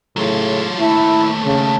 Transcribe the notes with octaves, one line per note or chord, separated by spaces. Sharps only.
A2 C#3 F#3 F4
D#2 A3 E4
C#3